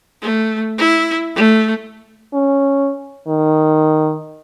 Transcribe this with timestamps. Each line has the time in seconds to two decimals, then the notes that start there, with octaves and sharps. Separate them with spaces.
0.22 A3
0.78 E4
1.35 A3
2.33 C#4
3.27 D#3